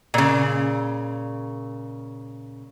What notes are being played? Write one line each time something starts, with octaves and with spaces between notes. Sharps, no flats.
A#2 C#3